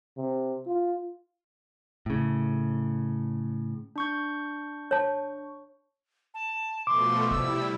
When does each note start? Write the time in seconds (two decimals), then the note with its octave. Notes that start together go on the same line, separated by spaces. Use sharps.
0.17 C3
0.67 F4
2.06 A2 C#3
3.96 D4 C#6 G6
4.91 C#5 A5
6.34 A5
6.87 B2 F3 A3 C6 D6
7.31 C3 G3 E4 E6